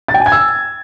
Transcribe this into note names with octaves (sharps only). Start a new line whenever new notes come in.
A6
G5
G#5
G#6
E6